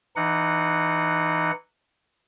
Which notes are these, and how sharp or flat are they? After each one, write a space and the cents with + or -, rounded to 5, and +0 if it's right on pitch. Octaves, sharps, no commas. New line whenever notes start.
E3 +0 D#4 -20 F#5 +0